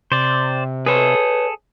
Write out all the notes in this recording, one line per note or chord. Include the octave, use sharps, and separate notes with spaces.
C3 C5 D5
G#4 A4 B4 C#5